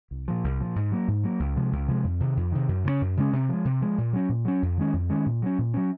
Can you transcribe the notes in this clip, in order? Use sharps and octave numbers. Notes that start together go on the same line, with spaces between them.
C2
A#2 F3
C2
A#2 F3
G#2
F#3 A#3
G#2
F#3 A#3
C#2
C3 F3 G#3
C#2
C3 F3 G#3
F2
C3 D#3
F2
C3 D#3
F#2
C#3 G#3 C#4
F#2
C#3 G#3 C#4
C3
F3 G#3
C3
F3 G#3
A#2
F#3 C#4
A#2
F#3 C#4
F2
D#3 G#3 C#4
F2
D#3 G#3 C#4
A#2
F#3 C#4
A#2
F#3 C#4